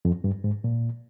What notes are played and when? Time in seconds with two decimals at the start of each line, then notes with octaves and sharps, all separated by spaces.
0.05 F2
0.24 G2
0.44 G#2
0.64 A#2